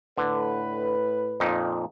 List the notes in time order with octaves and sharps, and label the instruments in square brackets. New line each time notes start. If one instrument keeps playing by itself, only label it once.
[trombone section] A2 B4 [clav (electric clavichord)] D3
[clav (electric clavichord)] F2 A#2 D#4